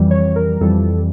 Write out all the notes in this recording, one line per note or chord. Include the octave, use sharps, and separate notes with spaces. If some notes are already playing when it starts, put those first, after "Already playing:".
Already playing: F2 E3 G3
C#5
A#4
F2 E3 G3 A4